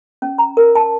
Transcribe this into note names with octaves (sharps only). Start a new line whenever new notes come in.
C#4
A#5
A#4
A5